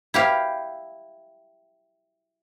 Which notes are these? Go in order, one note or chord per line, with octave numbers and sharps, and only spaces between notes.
E4 G4 F5